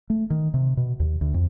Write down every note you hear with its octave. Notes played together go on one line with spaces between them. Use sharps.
A3
D#3
C3
B2
D#2
D2
F2